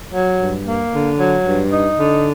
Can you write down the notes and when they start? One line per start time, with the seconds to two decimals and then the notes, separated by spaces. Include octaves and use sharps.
0.13 F#3
0.40 G2
0.66 A#3
0.93 D3
1.18 F#3
1.45 G2
1.71 D#4
1.97 D3